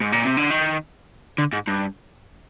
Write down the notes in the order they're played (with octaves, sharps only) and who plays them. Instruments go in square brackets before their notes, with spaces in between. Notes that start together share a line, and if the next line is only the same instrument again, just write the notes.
[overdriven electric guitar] G#2
A#2
C3
D3
D#3
D3
G#2
G2